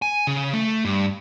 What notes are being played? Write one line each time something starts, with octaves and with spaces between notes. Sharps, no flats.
G#5
C#3
A3
G2